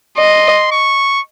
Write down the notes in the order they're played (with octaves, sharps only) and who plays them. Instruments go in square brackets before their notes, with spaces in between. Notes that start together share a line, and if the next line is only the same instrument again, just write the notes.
[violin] D#5 [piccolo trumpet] C6
[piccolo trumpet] C#6